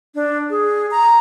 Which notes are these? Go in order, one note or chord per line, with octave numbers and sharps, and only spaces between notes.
D4
G#4
A#5